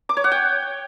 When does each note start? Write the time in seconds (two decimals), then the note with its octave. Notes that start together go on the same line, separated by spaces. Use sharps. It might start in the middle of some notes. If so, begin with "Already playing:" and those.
0.09 D6
0.17 C#5
0.24 F#5
0.32 G5